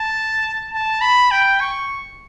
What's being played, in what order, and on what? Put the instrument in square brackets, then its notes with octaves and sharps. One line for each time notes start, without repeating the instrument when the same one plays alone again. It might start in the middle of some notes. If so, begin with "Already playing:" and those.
Already playing: [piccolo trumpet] A5
A5
B5
G5
C#6